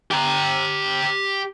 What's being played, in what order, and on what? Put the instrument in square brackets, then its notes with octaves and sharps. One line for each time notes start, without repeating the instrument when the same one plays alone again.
[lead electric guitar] G4 A#5